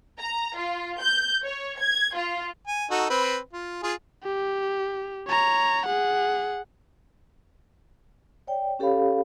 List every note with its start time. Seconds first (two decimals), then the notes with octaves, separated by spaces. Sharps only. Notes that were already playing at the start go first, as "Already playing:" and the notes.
0.19 A#5
0.57 F4
1.00 G6
1.43 C#5
1.80 G#6
2.15 F4
2.68 G#5
2.91 D#4 F#4 A4
3.10 C4 B4
3.53 F4
3.83 F4 G#4
4.24 G4
5.28 C#5 A#5
5.86 G#4 F#5
8.47 C#5 D5 G5
8.79 C#4 G4 A4 C#5 F5 B5